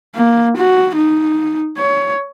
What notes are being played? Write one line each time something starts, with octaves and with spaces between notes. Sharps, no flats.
A#3
F#4
D#4
C#5